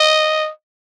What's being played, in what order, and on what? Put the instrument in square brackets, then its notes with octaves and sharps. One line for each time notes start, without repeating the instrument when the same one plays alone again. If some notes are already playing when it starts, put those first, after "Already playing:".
Already playing: [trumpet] D#5